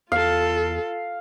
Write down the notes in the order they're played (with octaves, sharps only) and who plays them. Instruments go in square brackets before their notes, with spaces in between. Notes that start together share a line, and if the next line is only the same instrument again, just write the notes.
[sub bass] E2 [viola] F4 A4 [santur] F5